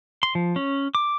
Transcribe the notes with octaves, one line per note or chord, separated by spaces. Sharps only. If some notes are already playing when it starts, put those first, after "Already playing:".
C6
F3
C#4
D6